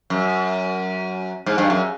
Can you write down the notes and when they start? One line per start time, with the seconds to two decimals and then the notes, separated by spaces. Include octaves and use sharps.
0.10 F#2
1.46 G#2
1.58 G2
1.70 F#2